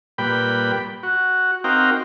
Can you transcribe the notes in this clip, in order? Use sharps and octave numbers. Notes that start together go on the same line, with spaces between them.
A#2 G3 B4 G5 B5
F#4
C4 D#4 F#4 A#4 F5 G5